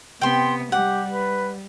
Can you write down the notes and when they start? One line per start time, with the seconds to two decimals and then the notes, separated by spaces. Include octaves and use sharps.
0.21 C3 B3 G5 C6
0.72 G3 G4 F#5
1.10 B4